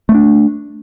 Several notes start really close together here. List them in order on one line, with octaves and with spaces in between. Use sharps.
A3 B3 D4